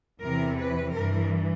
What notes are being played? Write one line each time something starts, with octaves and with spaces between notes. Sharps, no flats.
E2 C3 E3 A#4
B4
G2 E3 A#4